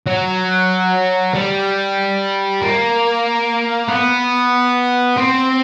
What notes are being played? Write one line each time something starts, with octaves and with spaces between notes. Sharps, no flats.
F#3
G3
A#3
B3
C4